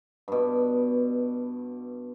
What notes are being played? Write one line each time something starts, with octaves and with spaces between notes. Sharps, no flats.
G2 B2